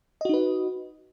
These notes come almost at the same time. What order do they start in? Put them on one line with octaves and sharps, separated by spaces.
D#5 F#4 D#4 B4